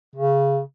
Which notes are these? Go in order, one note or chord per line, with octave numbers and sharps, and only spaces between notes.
C#3